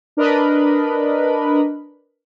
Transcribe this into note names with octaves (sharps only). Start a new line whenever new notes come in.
D4 A#4 B4 D#5 B5